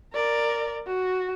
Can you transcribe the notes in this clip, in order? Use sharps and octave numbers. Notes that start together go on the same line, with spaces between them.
A#4 D5
F#4